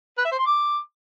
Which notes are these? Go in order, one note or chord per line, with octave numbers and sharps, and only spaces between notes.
B4
E5
C5
C6
D6